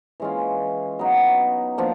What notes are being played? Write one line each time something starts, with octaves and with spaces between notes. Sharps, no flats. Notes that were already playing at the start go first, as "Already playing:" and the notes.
E3 G#3 C#4 F4
F#3 B3 D#4
F3 A#3 D4